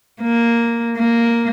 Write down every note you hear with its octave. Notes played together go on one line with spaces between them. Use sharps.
A#3
A#3